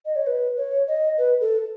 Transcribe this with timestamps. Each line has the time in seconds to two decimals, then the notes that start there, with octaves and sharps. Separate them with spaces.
0.05 D#5
0.16 C#5
0.27 B4
0.57 C#5
0.87 D#5
1.18 B4
1.41 A4